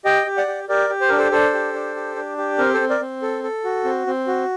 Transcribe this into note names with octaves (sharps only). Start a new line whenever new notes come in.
G4 D#5 G5
G4
D5 F#5
G4
G4 A#4 D5
G4
C5
D4 A#4
A4 C5
D4 A4 C5
G4
D4
G4
D4
G4
C4 A#4
A4 C5
C4
A#4 D5
C4
A4
A4
F#4
C4
C4
F#4